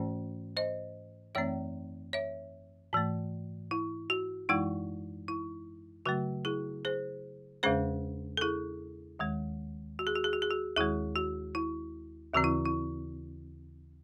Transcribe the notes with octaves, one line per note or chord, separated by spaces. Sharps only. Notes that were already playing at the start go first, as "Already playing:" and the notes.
Already playing: G#2 E3 A3 C#4 C5
C5 D#5
F#2 E3 A3 C4 C#5 E5
C#5 E5
G#2 E3 A3
E4
F#4
F#2 E3 G#3 D#4 E4
E4
C#3 F#3 A3 F#4
E4 G#4
G#4 C5
E2 C#3 G#3 C#4 G#4 C5
A4
E4 G#4
D#2 D#3 G#3
F#4
G#4
F#4
G#4
F#4
G#4
F#4
D#2 D#3 G#3 E4 G#4
F#4
E4
D#2 C#3 E3 C4 F#4
E4
E4